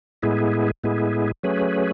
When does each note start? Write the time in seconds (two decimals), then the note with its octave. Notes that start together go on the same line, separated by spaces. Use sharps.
0.23 A2 G#3 B3 E4 G#4
0.84 A2 G#3 B3 E4 G#4
1.43 F#3 A3 C#4 G#4 B4